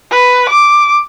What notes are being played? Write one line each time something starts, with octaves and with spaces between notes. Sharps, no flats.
B4
D6